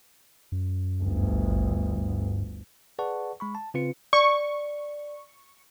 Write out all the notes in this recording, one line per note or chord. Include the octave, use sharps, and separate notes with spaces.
F#2
G1 D2
G#1
G2
G#4 B4 D5 F#5 A5 C#6
G#3 B5 C#6
A5
C#3 C4 F4 B4 C#7
D5 C#6